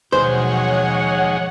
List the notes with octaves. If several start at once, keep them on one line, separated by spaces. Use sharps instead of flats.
D#2 B2 F3 F#3 G#3 C5 C#5 F#5